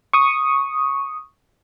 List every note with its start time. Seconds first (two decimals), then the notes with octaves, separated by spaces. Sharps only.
0.13 C#6 D#6